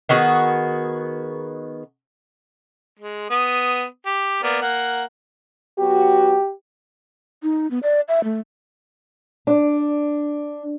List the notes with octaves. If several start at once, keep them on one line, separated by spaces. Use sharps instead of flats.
D#3 B3 F#4 G#4
G#3
B3 D#6
G4
A#3 B3 D5
A#3 F#5
F#3 B3 F#4 G4
D#4
B3
D5
E5
A3
D4